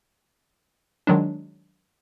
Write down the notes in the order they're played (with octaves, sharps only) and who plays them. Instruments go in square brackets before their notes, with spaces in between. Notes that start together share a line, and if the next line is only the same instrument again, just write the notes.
[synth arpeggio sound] D#3 F#3 G#3 D4